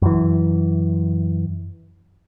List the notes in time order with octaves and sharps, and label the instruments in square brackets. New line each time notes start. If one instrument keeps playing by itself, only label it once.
[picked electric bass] F#2 E3